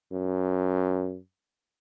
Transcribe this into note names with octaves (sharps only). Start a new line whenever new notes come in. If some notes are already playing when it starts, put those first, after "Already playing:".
F#2